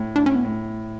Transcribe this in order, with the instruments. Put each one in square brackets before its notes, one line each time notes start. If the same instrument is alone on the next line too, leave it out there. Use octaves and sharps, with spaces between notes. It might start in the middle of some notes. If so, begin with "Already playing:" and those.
Already playing: [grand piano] A2
[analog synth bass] D4
C#4
B3
[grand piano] A2